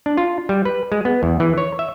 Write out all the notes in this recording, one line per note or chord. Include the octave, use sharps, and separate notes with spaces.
D4
F4
G3
B4
G#3
B3
E2
E3
C#5
E5